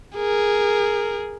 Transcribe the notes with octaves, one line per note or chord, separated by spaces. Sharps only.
G#4 A#4